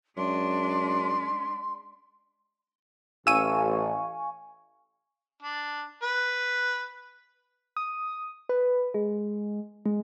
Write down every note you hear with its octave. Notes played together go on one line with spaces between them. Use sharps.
F#2 G#3 D4 C6
A1 F5 G#5 C#6 E6 D#7
D4
B4
D#6
B4
G#3
G#3